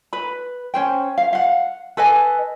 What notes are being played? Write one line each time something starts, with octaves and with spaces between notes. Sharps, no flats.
B4 B5
C#4 C5 G5
F5
F5 F#5
A4 B4 D#5 G#5